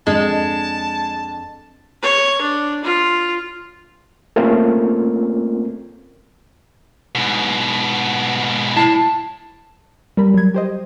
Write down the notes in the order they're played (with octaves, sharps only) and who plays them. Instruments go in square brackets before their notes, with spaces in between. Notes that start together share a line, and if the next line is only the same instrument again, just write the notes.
[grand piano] F2 D4 [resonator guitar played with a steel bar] G#3 [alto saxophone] A5
[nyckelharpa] C#5
D4
F4
[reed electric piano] A3 A#3 C4 C#4 F4 A#4
[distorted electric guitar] G#2 B2
[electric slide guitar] E4 A5
[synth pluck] G3 A#4 B5
F#3 G#6
G4 C5 D#5